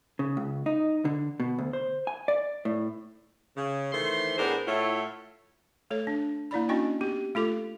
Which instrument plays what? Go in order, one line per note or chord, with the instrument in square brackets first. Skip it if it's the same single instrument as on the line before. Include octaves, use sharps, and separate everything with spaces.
[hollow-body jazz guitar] C#3
C#2
D#4
D3
B2
D2
C5
G#5
D5
A2
[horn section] C#3
D#3 E3 A3 C5 C6
A2 B3 D4 G#4 A#4 C5
A2 A3 E4 F4 C#5 F#5
[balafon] A3 A4 C#5
D4
A#3 E4 D5 B5
C#4 D4 F#4 D#5 G5
B3 G4
A3 F4 A4 D6